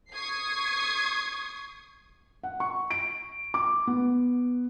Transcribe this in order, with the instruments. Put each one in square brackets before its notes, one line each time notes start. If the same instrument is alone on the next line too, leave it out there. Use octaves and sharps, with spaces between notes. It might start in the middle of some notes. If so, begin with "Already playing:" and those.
[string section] C#6 D#6 G#6 C7
[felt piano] F#5
C#6
D7
D6
B3